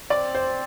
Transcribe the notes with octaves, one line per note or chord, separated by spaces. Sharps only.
C4 D5
C5